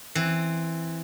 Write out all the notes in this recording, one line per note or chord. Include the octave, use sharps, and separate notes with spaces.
E3 C4